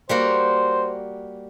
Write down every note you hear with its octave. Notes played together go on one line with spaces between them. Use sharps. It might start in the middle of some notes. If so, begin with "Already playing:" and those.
G3 A#3 F#4 C5